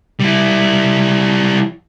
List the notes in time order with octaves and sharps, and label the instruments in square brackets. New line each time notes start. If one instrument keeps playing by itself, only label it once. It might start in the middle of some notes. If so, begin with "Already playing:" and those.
[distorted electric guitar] G3 E4